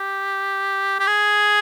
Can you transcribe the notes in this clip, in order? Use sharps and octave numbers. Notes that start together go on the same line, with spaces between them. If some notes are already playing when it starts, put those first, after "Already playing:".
Already playing: G4
G4
G#4